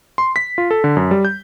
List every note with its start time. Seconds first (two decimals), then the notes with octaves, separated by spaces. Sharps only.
0.18 C6
0.36 B6
0.58 F4
0.71 A4
0.84 D3
0.97 F#2
1.11 G3
1.25 G6